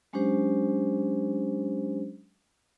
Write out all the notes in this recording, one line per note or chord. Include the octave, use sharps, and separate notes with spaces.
F#3 G#3 C#4 D4 G4 C5